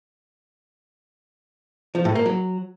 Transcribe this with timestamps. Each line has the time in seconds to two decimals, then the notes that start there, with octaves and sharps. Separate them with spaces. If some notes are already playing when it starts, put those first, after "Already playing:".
1.95 F3
2.05 A2
2.15 A#3
2.26 F#3